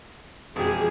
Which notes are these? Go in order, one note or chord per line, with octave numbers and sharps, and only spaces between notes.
E1 F2 G4 G#4